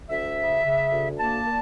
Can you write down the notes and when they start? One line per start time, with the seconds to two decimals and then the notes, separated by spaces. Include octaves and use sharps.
0.10 D2 E5
0.37 C#3
0.64 C#3
0.91 D2
1.18 A#3 A5
1.46 A#2